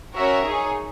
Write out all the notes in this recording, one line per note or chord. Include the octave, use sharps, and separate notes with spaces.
C#4 F#4 A#4 C#5 E5
D#4 G#4 C#5